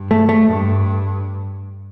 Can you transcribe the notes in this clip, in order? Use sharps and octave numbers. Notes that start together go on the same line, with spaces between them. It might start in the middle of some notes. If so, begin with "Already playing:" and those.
Already playing: G2
A3
A3
G2